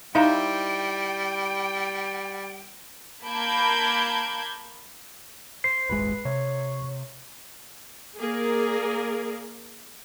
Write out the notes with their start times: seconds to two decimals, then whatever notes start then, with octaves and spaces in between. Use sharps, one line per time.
0.15 G3 D#4 E4 C5 D#5 F5 G5 A#5
3.26 A#3 A5 B5 G6 G#6 D7
5.64 C5 C7
5.89 D#1 G#1 G#3 B4
6.25 C3 C#5
8.18 A#3 G#4 A#4 D5